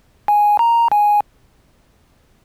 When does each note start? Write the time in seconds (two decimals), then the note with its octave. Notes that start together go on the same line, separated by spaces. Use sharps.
0.28 G#5
0.59 A#5
0.92 G#5